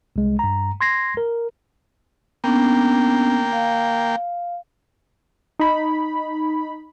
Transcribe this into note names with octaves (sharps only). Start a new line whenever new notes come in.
C2 G#3
G2 A#5
C6 G#6 A#6 C7
A#4
A#3 B3 C#4 D4 G5
F5
D#4 B5